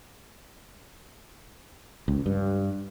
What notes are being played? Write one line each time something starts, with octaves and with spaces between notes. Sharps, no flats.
C#2
G2